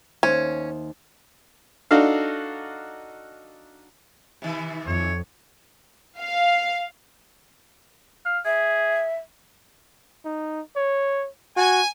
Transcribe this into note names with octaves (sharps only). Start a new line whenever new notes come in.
D#2 C#4 C5 E5
D4 D#4 F#4 A4 F5
C3 D#3 E3
F2 C#5
F5
F5
G#4 E5
D#4
C#5
F#4 G#5